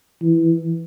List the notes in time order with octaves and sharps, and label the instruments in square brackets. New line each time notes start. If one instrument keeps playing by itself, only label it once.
[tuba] E3